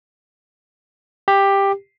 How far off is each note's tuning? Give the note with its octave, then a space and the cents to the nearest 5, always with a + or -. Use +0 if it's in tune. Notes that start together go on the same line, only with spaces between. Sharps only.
G4 +10